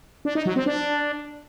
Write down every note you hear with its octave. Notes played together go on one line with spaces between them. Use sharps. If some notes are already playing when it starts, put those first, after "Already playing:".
D4
D#4
F#3
C4
D4